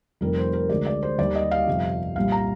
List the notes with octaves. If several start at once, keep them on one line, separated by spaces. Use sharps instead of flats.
F1 F2 D#3 G3 A#4
C5
A#4
D2 D3 G#3 D5
D5
C5
D#2 D#3 G3 D5
D#5
F5
G1 F2 C3
C2 A#2 G3 F5
A#5